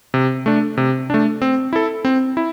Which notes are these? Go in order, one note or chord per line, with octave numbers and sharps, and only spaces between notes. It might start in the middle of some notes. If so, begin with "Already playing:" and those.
C3
A3 D4
C3
A3 D4
C4
E4 A4
C4
E4